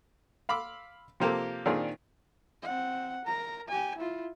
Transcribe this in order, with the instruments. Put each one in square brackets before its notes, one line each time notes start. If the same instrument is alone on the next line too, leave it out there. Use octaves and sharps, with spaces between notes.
[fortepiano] F5 B5 C6 D6 E6
C3 F3 A#3 G4 A4 C5
A#2 D#3 C4 D4 F4 G#4
[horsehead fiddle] C4 F#5
A#4 A#5
G4 G#5
E4 F4